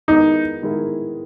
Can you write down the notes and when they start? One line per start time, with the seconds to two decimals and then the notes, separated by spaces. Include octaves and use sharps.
0.08 D#3 G#3 B3 D#4 E4 A#4
0.62 D#3 G#3 B3 E4 A#4